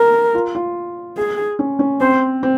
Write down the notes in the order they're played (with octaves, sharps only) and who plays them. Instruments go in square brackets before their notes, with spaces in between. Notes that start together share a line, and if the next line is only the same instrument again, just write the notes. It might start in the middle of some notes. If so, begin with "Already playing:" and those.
Already playing: [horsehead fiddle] A#4
[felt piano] F4
F4
[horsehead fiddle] G#4
[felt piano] C#4
C#4
[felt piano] C4 [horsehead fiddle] C5
[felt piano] C4